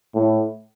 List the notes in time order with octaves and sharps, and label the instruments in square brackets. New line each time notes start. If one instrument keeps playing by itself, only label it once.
[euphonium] A2